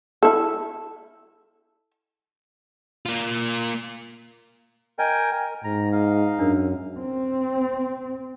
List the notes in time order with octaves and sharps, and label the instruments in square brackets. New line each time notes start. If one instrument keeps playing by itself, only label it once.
[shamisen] E4 A4
[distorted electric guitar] A#3 F4
[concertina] A#4 G5 G#5 [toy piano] D#5
[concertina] A#4
[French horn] G#2 [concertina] A#5
[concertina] D#4 F5
[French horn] F#2 [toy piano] D4 A#4
[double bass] C4